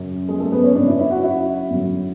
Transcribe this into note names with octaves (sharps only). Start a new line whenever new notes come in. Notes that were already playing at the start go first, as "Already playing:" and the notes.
Already playing: F#2 C#3 F#3
G#3 G#4
A3 A4
B3 B4
C#4 C#5
F#2 C#3 F#3 D4 D5
E4 E5
E4 E5
F#4 F#5
E4 E5
F#2 D3 F#3